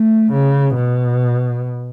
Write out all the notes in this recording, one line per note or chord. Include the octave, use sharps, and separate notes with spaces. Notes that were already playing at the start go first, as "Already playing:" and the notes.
Already playing: A3
C#3
B2